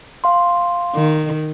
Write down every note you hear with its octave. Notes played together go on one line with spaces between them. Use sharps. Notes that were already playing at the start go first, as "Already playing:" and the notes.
F5 C6
D#3